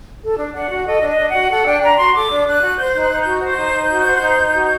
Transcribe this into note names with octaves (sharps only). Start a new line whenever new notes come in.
A4
D4
D4 F#5
F#4
A4 D#5
D4
D#5
D4
F#5
F#4
A4 F#5
D4 G5
D4 A#5
F#4 C6
A4 D6
D4
D4 F#6
F#4
C5 G6
D#4 G6
F#6
D#4
G6
F#4
C5 G6
D#4
D#4
F#4
C5
D#4
D#4
F#4